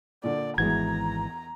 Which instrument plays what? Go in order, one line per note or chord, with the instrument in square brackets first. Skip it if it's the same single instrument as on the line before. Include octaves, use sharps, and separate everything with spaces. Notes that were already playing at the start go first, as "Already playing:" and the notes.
[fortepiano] A#2 D3 [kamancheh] D5
[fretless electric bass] G#1 E3 G#3 [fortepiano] E2 F#4 [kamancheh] A#5 [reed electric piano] G#6